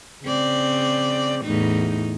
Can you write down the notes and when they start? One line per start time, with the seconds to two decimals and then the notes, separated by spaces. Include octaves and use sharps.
0.24 C#3 C4 D5
1.45 E2 A2 D#4